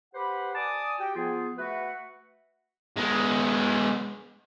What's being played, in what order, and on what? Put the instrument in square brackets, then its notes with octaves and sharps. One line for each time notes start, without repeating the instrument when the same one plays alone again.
[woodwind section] G4 B4 C5 F#5 B5
D5 G#5 A5 D6 D#6
F#4 G4 G5
F3 B3 F4 G#4
A3 F#4 B4 E5 F#5
[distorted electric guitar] G#3 B3